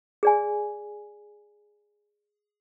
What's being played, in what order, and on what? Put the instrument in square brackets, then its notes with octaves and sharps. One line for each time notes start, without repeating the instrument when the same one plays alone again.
[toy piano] G#4 D5 G#5